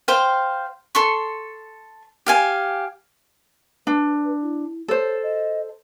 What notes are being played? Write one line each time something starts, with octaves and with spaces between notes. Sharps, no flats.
C5 F5 G5
A4 C6 C#6
G4 F5 G#5
D4 B4
E4
A4 C5 C#5
D#5